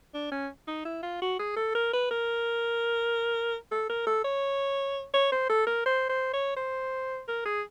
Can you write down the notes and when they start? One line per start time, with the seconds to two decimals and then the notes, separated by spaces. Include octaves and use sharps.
0.14 D4
0.32 C#4
0.68 D#4
0.85 E4
1.03 F4
1.22 F#4
1.39 G#4
1.56 A4
1.75 A#4
1.93 B4
2.11 A#4
3.71 A4
3.89 A#4
4.07 A4
4.24 C#5
5.14 C#5
5.32 C5
5.49 A4
5.67 A#4
5.86 C5
6.09 C5
6.33 C#5
6.57 C5
7.28 A#4
7.46 G#4